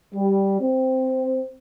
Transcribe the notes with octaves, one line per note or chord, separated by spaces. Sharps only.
G3
C4